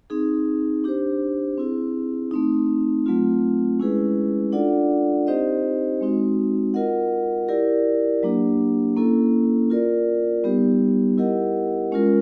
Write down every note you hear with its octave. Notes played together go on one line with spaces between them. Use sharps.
C4 D#4 G#4
D4 G4 C5
C4 E4 G#4
A3 C4 D#4
F#3 A3 C4 F4
G#3 C#4 E4 G#4 B4
D4 F4 A4 D5 F#5
C4 D#4 G4 C5 D#5
G#3 C4 D#4 F#4
F4 A#4 D#5 F#5
E4 G4 A#4 D5
F#3 A#3 D4 G4
A#3 C#4 E4 A4
F4 A#4 D5
G3 B3 D#4 G4
E4 G4 A#4 D#5 F#5
G#3 C#4 F4 A#4